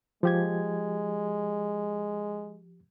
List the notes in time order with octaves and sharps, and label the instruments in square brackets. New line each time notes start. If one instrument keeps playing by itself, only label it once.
[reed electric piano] F3 G4 G#6 [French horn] G#3